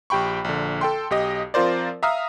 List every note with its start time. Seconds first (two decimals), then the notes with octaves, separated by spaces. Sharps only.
0.10 A#1 G4 G5 B5 C#6
0.44 A#1 D3
0.81 A4 G5 C6
1.10 B1 G4 D#5
1.54 F3 C4 F4 A#4 C5 D5
2.03 E5 F5 A#5 D#6 F6